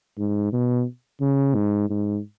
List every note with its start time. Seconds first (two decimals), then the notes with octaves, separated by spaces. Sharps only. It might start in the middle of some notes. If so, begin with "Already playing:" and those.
0.18 G#2
0.52 B2
1.21 C#3
1.55 G#2
1.90 G#2